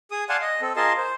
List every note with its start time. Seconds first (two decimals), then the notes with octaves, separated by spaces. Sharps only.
0.11 G#4 D#6
0.29 D5 F5 F#5 G#5 A5 C6
0.42 D#5
0.61 C4 A4
0.76 F4 G#4 A#4 D#5 A5 C6
0.98 C5